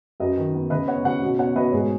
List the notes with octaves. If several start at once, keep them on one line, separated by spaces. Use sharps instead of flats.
F#2 B4 D#5
D#3
B3
C#3 B4 D#5
B3 C#5 F#5
C#3 C#5 F#5
B2
B3 C#5 F#5
B2 B4 D#5
G#2 G#4 C#5